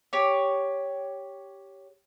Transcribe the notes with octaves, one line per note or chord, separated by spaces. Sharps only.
G4 C#5